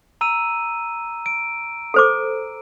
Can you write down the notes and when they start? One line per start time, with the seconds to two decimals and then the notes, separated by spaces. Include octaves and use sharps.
0.21 A#5 E6 D#7
1.26 D7
1.94 A4 C5 D6